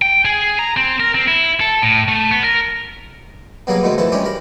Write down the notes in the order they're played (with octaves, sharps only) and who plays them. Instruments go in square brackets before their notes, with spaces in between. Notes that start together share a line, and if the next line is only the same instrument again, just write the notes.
[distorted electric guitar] G5
G#4
A#5
C4
A#4
C4
E4
A4
A2
A3
B3
A#4
[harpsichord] B2 F#3 G3 A#3 G#4 A#4
G#2 B2 D3 D#3 A3
E3 F3 A3 A4
G3 G#3 C#4 D4 G4
G4 A#4 B5